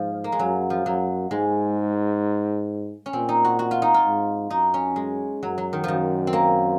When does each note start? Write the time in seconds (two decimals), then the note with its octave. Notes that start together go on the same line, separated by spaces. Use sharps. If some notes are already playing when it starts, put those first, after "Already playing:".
Already playing: G#2 F3
0.24 A#3
0.32 G#3
0.39 F#2 F#3
0.70 F3
0.86 F#2 F#3
1.31 G#2 G#3
3.06 C#4
3.13 A#2 C4
3.29 D#4
3.45 F#4
3.59 F#4
3.71 F4
3.82 D#4
3.94 F4
4.06 G#2
4.50 F#2 D#4
4.74 C#4
4.96 G#3
5.43 F#2 F#3
5.58 F#3
5.73 D#3
5.84 F#2 D#3 F3
6.27 C4
6.33 A#3